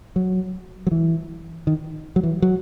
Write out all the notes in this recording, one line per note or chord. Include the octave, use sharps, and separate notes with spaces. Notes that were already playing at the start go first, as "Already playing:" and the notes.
F#3
F#3
E3
D#3
F#3
E3
F#3